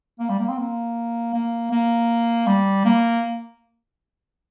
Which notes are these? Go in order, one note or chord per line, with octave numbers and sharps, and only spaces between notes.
A#3
G3
A#3
C4
A#3
A#3
A#3
G3
A#3